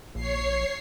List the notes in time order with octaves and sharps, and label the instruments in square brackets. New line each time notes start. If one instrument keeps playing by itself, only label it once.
[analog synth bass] A#1 [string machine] C#5 C7